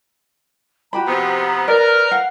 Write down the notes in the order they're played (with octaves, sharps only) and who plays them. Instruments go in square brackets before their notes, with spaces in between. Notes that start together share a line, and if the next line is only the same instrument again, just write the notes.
[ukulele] F#4 G4 B5 [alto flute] A#5
[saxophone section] C3 F3 B3
[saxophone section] A#4 [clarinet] B4 [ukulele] D5
[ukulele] F5 F#5